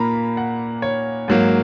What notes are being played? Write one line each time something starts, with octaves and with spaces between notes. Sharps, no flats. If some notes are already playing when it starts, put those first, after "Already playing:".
Already playing: A#2 A#3 A#5 B5
F#5
C#5
G#2 F#3 A#3